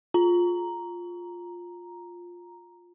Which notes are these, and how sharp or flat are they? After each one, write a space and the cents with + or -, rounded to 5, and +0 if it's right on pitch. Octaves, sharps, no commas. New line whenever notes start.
F4 +10 A#5 +0